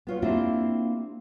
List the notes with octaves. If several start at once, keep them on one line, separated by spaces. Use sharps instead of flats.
B3 F4 C#5
A#3 C4 D4 E4 F4 G4